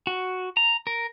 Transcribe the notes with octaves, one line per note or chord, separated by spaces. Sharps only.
F#4
A#5
A#4